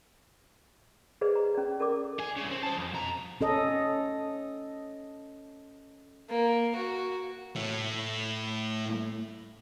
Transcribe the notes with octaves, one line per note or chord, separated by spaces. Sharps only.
G#4 A4 B4 C5 D5 D#5
A#5
C#4 D5
A4 A#4 D5 D6
G#4
C2 C#3
C4
C5 A5
F2
B2 A#5
C#4 A4 D#5
A#3
F#4
A2 A3